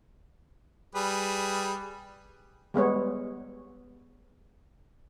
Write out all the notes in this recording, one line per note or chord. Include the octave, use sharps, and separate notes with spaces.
G3 G#4 B4
G3 G#3 B3 C#5